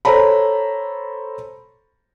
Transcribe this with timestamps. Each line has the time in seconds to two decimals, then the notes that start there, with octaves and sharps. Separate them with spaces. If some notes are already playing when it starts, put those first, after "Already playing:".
0.05 A4 C5 C#5 A#5 B5